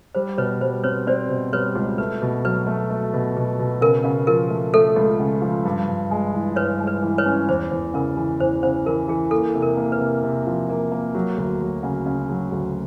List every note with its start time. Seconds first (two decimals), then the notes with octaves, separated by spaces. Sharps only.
0.15 G3 C5
0.37 B2 B4 C#5
0.61 G3 C5
0.83 C4 B4 C#5
1.07 C4 C5 D5
1.29 B2
1.53 G3 B4 C#5
1.75 C#2
1.98 A3 B4
2.22 B2
2.45 F#3 B4
2.67 A3
2.90 A3
3.14 B2
3.36 B2
3.59 B2
3.81 C#3 A#4
4.04 C#3
4.27 F3 A#4
4.50 A3
4.74 A3 A4
4.96 C#2
5.20 C#3
5.42 F3
5.65 G2
5.89 G2
6.11 G#3
6.34 E3
6.56 G2 B4 C#5
6.80 G#3
6.87 B4
7.02 E3
7.18 B4 C#5
7.25 C#4
7.48 E2 C5
7.72 E2
7.94 C#3 A#4
8.17 E3
8.40 E2 C5
8.63 C#3 C5
8.86 E3 A#4
9.08 E3 G#4
9.31 A#3 A4
9.55 C3
9.62 A#4
9.77 A#3
9.92 B4
10.00 C3
10.23 C3
10.46 F3
10.69 A#3
10.92 A#3
11.14 F#3
11.37 D2
11.61 F#3
11.83 C#3
12.06 C#3
12.29 F#3
12.52 D2